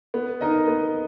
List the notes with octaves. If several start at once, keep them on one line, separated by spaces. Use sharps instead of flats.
B3
D#4 A#4 D#5
B3